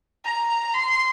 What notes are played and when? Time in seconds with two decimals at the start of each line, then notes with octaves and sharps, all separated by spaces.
0.25 A#5
0.74 C6